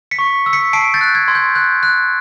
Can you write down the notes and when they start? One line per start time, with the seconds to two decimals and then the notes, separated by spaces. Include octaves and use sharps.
0.11 B6 C#7
0.19 C#6
0.46 E6
0.53 B6 C#7
0.73 A5 C7 D7
0.94 G6 A6
1.01 F#6
1.15 G#6
1.28 C6
1.35 G6
1.55 F#6 G6
1.83 F#6